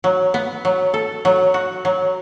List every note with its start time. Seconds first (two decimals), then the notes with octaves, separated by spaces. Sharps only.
0.04 F#3
0.34 B3
0.65 F#3
0.94 A4
1.25 F#3
1.54 F#4
1.85 F#3